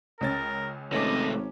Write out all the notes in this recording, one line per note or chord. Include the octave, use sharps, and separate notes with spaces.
C#2 C#4 A#4 A6
G#1 C3 A3 C#4 D#5 D6